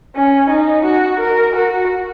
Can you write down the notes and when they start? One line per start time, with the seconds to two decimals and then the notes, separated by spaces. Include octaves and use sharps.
0.16 C#4
0.50 D#4
0.86 F#4
1.20 A#4
1.56 F#4